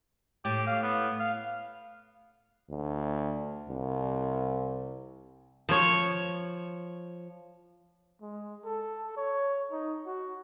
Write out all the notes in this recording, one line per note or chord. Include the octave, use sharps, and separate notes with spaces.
A2 G4
F5
B3
F5
D2
C2
F3 C#5
G#3
A4
C#5
D#4
F#4